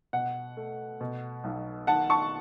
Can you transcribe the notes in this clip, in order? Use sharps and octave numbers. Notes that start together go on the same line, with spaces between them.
B2 F#5
A3
B2
B1
D#3 F#5 A5
A5 C#6